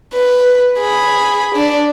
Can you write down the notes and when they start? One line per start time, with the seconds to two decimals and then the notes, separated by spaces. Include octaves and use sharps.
0.14 B4
0.78 G#4 B5
1.55 D4 D5